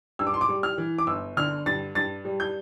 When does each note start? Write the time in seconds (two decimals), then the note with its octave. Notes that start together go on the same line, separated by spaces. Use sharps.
0.19 G2 E6
0.27 D6
0.34 C6
0.41 D6
0.49 G3
0.63 F6
0.78 E3
0.98 D6
1.07 G1 E6
1.37 D3 F6
1.66 G2 A6
1.95 G2 A6
2.25 G3
2.40 G6